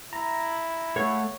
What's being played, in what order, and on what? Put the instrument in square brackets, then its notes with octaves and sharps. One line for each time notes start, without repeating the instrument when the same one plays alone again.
[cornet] E4 [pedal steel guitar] A#5
[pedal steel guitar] A3 F5 F#5 [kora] C#5